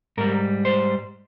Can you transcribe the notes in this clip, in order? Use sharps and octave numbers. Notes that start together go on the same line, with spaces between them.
G#2 G3 A#4
C5